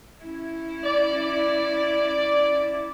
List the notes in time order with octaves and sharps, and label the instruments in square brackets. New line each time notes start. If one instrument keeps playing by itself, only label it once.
[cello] C#4 E4
[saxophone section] D5